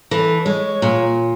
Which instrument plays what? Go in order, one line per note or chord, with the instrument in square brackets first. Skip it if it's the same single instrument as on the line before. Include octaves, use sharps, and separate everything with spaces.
[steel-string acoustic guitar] E3 [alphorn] A4
[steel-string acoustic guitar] G#3 [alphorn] C#5
[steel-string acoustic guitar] A#2